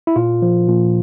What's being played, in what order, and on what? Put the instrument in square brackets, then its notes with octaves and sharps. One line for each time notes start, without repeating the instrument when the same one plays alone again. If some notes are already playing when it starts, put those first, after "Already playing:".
[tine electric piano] E4
A#2 F4
F3
A#2